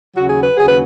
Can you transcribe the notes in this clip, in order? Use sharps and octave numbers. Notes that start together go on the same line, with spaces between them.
D#2 C#3 F#3 F#4
G#4
B4
D#2 C#3 F#3 G#4
B4